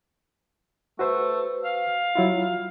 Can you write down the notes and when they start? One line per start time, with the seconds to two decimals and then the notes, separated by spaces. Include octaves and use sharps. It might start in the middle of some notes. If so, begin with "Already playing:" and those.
0.99 A3 F#4 B4 C5
1.65 F5
2.15 F#3 E4 F4